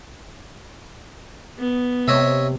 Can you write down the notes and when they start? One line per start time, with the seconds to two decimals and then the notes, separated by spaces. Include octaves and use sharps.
1.58 B3
2.08 C3 C#5 D#5 E5